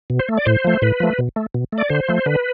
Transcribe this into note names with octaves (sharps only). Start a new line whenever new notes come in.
B2
C5
A3
D5
A2 C5
F3 A3
A2 B4
F3 A3
B2
A3
B2
A3
D5
D3 C5
F3 A3
D3 B4